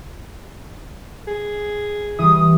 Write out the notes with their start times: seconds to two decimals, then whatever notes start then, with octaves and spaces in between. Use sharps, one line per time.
1.27 G#4
2.19 E3 G3 D#6